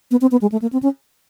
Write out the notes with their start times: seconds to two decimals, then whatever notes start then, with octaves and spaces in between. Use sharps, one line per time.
0.11 B3
0.21 C4
0.31 B3
0.41 G#3
0.52 A3
0.62 A#3
0.73 C4
0.83 C#4